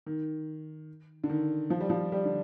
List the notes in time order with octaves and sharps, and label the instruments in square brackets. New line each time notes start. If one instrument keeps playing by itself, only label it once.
[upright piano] D#3
D3
D#3
F3
G3
F3
G3
D3